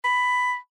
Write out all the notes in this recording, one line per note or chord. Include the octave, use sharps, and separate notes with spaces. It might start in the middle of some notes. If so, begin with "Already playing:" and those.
B5